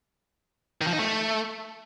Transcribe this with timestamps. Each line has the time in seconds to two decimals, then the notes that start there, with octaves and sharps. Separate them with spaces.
0.81 D#3
0.87 F3
0.93 D#4
0.99 A3